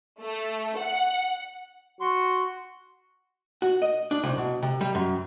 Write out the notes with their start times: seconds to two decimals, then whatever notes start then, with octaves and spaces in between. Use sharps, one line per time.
0.20 A3
0.78 F#5
2.00 F#4 C6
3.62 F#4
3.82 D#5
4.11 D4
4.24 C2
4.38 B2
4.63 C3
4.81 G3
4.95 F#2